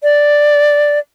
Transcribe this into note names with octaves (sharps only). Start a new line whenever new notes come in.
D5